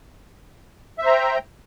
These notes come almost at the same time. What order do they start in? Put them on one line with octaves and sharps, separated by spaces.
E5 C5 A#5 G5